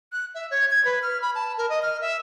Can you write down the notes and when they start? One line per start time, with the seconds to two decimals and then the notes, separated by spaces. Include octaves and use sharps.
0.12 F#6
0.35 E5
0.51 C#5
0.70 G#6
0.85 B4
1.02 F6
1.22 B5
1.35 A5
1.57 A#4
1.69 D#5
1.82 F6
2.01 E5